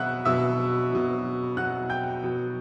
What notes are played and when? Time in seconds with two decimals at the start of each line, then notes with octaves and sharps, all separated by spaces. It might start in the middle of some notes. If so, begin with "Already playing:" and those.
Already playing: B2 F#3 E5 F#5 E6 F#6
0.25 B2 F#3 E5 E6
0.92 B2 F#3
1.57 B2 F#3 F#5 F#6
1.90 G5 G6
2.23 B2 F#3